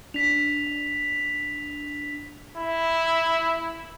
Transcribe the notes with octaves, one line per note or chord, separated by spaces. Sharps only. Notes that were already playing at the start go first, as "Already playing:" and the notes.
D4 B6 F7
E4